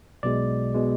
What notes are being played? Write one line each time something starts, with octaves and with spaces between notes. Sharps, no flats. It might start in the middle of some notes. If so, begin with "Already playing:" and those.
B1 B2 G#3 D5
B2 G#3